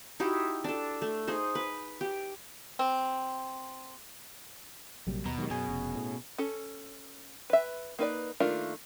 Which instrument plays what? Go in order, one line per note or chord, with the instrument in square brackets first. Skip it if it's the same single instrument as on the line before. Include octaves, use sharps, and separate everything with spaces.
[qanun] D#4 E4 F#4 G4
D4 A4
A3
D#4 G#4 C5
B4
G4
[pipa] C4
[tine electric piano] A#1 C3 [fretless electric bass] F#3 G3 A#3
[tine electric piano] D#2 A#5 [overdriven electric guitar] B2
[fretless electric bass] D#3 [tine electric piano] F#3 G#3 G4
[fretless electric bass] F#2 [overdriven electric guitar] B2 [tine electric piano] C#4 G#4 G#5
[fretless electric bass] F1
A2
[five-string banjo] C#4 A4
B4 E5
A#3 D#4 B4 D5
D#3 A3 A#3 D4 F4